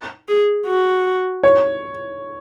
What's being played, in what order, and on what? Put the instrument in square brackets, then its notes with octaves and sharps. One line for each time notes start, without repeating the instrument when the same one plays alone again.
[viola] G#4
F#4
[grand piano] C#5